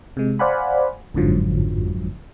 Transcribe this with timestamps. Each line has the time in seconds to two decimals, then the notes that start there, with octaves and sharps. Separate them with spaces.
0.17 C3 G#3
0.39 C5 D5 F5 F#5 G#5 B5
1.15 G1 F2 G#2 D3 F3 F#3